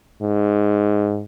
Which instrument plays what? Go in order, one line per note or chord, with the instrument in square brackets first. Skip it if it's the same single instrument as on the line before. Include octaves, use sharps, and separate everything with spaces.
[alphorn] G#2